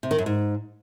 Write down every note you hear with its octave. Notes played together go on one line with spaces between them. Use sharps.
C3
D#3
F#2
G#2